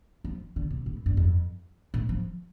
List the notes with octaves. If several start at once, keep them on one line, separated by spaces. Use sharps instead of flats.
F3
D3
C3
A2
G2
F2
A2
F3